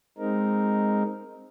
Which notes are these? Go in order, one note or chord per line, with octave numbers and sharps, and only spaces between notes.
G#3 C4 D#4 A#4